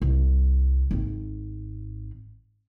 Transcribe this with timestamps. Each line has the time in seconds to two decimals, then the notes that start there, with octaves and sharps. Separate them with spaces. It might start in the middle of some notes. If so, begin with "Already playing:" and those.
0.02 C2
0.91 G#1 C4